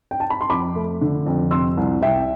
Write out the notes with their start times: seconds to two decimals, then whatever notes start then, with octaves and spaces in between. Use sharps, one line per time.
0.11 G5
0.20 A5
0.30 B5
0.41 C6
0.50 F2 B5 D6
0.76 A3
1.01 D3
1.26 F2
1.51 C3 C6 E6
1.77 C2
2.02 C2 E5 G5